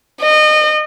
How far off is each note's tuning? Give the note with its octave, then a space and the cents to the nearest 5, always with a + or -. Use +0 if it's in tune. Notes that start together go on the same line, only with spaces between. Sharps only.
D#5 -30